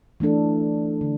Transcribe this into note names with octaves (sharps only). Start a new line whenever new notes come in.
E3 A3 D4 A4
D3